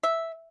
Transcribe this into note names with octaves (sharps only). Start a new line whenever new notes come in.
E5